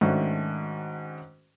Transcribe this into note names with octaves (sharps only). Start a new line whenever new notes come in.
G#2 D#3 A3 C#4 D4 F#4